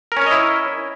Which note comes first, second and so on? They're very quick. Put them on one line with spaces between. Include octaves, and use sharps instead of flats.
A#4 C#4 C#5 D#5 E4